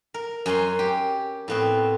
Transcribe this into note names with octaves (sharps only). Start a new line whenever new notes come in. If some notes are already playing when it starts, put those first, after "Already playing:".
A#4
F#2 C#4 G#5 C6
G4
A2 B3 C4